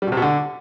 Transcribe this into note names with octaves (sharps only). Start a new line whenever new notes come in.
G3
B2
C3
B2
D3